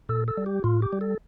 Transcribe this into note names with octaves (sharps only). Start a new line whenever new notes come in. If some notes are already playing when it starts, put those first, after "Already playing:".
A#2 A4
A4
G3
G4
A2 F4
G4
G3
A4